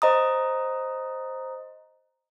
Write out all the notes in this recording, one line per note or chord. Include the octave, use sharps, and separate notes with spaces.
C5 D#5 A#5 D#6